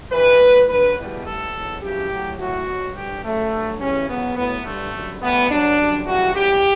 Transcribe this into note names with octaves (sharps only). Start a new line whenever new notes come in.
G2 E3 G3 B4
A2 F#3
G2 D3 F#3 B4
E2 B2 G3
A2 G3 A4
E2 B2 F#3
F#2 C#3 E3 G3 G4
A2 F#3
A2 F#3 F#4
B2 F#3
G2 D3 G3 G4
F#2 C#3 F#3 A3
G2 F#3
E2 C#3 E3 G3 C#4
E2 C#3 F#3 B3
A2 F#3 B3
G2 D3 G3 A3
F#2 D3 G3
A2 E3 G3 B3
G2 F#3 D4
F#2 D3 G3
F#2 C#3 E3 G3 F#4
E2 C#3 G3 G4